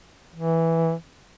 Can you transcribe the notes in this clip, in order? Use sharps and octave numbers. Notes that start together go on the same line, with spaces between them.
E3